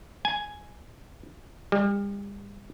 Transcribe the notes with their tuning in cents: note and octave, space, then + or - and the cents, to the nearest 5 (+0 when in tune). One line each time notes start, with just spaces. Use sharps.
G#5 +5
G3 +40